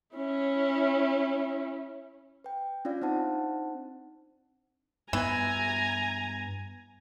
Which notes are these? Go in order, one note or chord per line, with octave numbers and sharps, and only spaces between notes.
C#4 E4
B4 G5
C#4 D4 F4 D5 F5
C4 D4 D#4 C5 F#5 A5
G2 E3 B3 G#5 A#5